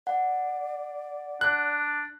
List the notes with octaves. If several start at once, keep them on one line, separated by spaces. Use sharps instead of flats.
D5 F#5
D4 F#6